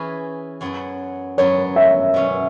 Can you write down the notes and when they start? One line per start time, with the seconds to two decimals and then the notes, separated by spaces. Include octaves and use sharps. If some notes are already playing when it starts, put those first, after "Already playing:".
Already playing: E3 C#4 E4 G#4 B4
0.61 F#2 F#3 B3
1.38 F#2 F#3 B3 C#5
1.76 E5
2.14 B2 F#3 C#4